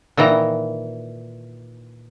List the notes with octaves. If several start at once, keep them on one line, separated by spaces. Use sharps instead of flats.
A#2 D#3 E3 A#5